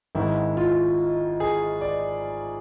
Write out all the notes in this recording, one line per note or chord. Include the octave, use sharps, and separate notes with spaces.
G#1 G#2 D#3 G#3 E4
F4
G#4
D5